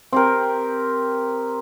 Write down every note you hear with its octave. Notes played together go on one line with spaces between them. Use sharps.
C4 G4 A#4